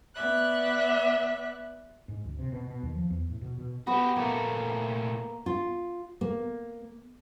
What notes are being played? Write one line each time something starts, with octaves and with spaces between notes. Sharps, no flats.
B3 D5 E5 F#6
G#2
D2
C3
B2
B2
D#2
F3
E2
A2
B2
B2
B3 F#4 G4
A#2 A3 A#3
F4
A#3